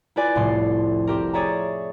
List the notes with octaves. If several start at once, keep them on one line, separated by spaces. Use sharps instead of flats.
E4 F4 B4 D5 G#5
F1 C2 A2 A3 C6
C4 G4 A#4
G#4 C#5 D5 E5 A#5